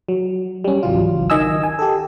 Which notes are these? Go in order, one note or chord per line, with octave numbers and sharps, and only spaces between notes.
F#3
G3 C#4
G#1 C#2 E3 F#3 F4
D#3 D#5 G#5 E6
G#5
G4 A4